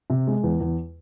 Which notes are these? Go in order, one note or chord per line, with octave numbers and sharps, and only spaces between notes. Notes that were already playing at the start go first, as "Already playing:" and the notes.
C3
G#3
E2
E2